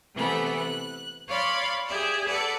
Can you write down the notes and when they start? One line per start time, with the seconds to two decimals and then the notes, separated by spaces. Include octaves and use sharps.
0.14 C3 E3 A3 B3 B5
0.55 F#6
1.28 C#5 D5 F5 B5 C6
1.88 G4 G#4 D5 E5
2.27 A4 B4 D5 F#5